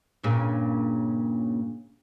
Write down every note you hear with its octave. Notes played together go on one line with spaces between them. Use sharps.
G2 A#2 C#3